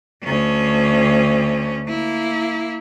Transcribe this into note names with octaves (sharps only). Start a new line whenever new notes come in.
D2 C#4
A#3 E4